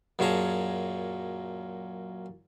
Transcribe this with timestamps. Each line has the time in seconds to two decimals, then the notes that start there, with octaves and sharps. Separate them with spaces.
0.19 F#2 A#2 C#4 G#4 A5 A#5